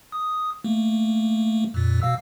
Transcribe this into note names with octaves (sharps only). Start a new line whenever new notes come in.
D#6
A3 A#3
F2 A#2
B2 F5 E6